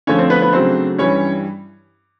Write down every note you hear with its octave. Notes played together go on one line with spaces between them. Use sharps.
D3 F3 A3 C#4 C#5
C4 C5
B3 B4
B3 B4
C#3 F#3 A3 C4 D4 C5
G2 E3 G3 C#4 C#5